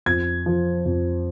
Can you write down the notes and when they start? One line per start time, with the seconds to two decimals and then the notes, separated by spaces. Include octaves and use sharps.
0.06 F2 G#6
0.46 F3
0.85 F2